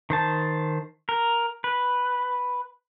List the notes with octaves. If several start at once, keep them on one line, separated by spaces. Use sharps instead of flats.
D#3 C5 A5
A#4
B4